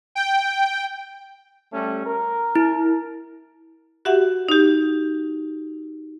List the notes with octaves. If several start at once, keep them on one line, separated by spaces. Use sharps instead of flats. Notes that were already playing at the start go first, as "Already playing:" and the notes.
G5
G3 A3 C#4
A#4
E4
F#4 G4 E5 F#5
D#4 G4